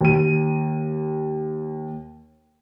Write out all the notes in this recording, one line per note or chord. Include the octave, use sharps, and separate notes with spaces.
D#2 D#7